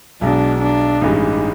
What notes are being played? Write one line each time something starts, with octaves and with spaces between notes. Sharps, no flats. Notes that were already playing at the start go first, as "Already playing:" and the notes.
B1 B2 G#3 D4
D4
A1 G2 E3 G#3 D#4